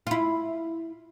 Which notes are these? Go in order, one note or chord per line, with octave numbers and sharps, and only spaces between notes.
E4 F4